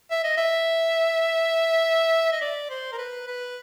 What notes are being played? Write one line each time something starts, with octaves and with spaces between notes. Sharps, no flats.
E5
D#5
E5
D#5
D5
C5
A#4
B4
B4